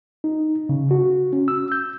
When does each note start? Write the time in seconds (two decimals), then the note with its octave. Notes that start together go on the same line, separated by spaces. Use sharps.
0.24 D#4
0.69 C#3
0.91 F#4
1.33 C#4
1.48 E6
1.72 G6